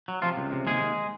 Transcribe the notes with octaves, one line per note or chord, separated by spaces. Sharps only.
F#3
C3 F3 F4
C#2
C3
D#2 G#3 G#4
D#2